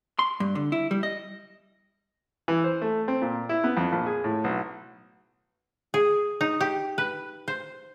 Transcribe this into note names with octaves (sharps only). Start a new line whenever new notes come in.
C6
G2
D3
E4
G3
D#5
E3
C5
A3
C4
A#2
E4
B3
F2
A#1
G#4
A2
B1
G#4
D#4
G4
B4
C5